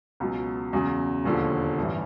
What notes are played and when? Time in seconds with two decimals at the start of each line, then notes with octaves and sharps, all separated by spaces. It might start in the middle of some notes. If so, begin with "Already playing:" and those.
0.20 C#2 B2 F#3
0.73 E2 C#3 F#3
1.24 E1 D#2 D3 F3
1.77 A1 G2 E3